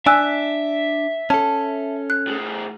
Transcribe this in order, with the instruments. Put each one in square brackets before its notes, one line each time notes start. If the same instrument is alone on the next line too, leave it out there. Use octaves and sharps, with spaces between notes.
[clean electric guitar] D4 [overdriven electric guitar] E5 [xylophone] G#5 E6 F#6
[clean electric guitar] C#4 A4 [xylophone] A5
[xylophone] F#6
[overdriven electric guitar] A2 G#4